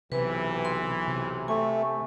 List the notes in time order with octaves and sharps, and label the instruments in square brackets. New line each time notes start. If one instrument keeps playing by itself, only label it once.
[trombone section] B1 E3 [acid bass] C3 [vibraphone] B4
[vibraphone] C6
[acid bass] C3
[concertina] A3 [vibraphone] G#5